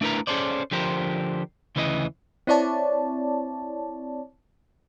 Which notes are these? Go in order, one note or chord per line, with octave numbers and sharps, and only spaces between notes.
A3 D4 E4 A#4 B4 A#5
C#4 G#4 A4 C5 D5
D3 F3 G4 A#4 C5
D2 C#3 E3 E4 D#5
C4 E4 C#5 D5 A5